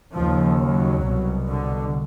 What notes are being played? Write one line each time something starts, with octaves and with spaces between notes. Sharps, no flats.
D#2 C#3 F3
F#3
C2 B2
D3